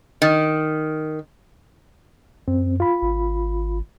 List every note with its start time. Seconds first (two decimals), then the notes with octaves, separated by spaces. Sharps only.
0.22 D#3
2.48 F#2 C4
2.80 F4 B5
3.02 G#1